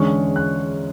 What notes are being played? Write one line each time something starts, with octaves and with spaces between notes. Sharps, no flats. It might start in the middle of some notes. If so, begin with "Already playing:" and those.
Already playing: E2 D3 G#3 C#4 C#6
F#6